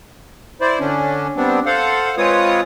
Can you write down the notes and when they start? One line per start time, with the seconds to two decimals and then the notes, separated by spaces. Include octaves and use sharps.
0.61 E4 C5 D5
0.80 D3 C#4 D4
1.37 G3 B3 C4 D4
1.66 A4 C5 F5 F#5
2.18 G#3 C4 F4 B4 C#5 D#6